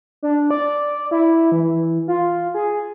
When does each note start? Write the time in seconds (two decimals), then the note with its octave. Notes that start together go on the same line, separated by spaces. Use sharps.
0.23 D4
0.51 D5
1.11 E4
1.52 E3
2.08 F4
2.54 G#4